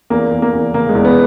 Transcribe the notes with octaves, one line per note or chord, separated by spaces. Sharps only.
E2 A#3
E2
A#3
E2
C#3 A#3
G#3
E2
B3